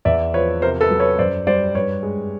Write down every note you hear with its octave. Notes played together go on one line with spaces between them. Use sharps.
E2 D5 E5
F3 B4 C#5
C3 A#4 C5
A4 B4
F#3
B4 C#5
F#2 C5 D5
G3 C5 D5
G2 B4 C#5
G#3